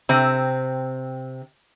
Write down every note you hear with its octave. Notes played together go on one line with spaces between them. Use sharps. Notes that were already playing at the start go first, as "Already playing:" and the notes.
C3 C4